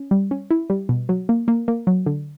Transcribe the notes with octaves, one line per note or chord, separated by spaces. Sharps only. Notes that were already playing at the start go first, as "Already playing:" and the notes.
Already playing: C#4
G3
C#4
E4
G3
B2
F#3
A#3
A#3
A#3
F#3
D3